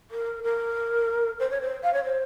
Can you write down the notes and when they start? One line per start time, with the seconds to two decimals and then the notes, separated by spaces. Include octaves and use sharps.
0.11 A#4
0.43 A#4
1.40 C5
1.51 C#5
1.61 C5
1.83 F5
1.94 C#5
2.05 C5